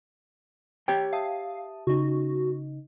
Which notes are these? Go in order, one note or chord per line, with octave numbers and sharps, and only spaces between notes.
G4 C#5 G5
E5 F5 A5 D#6
C#3 D#4 F#4